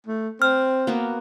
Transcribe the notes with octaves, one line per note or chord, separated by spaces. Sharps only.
A3
C4 F6
A#3 B3 F#4